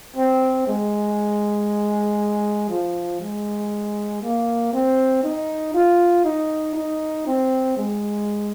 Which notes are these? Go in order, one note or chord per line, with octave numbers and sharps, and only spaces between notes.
C4
G#3
F3
G#3
A#3
C4
D#4
F4
D#4
D#4
C4
G#3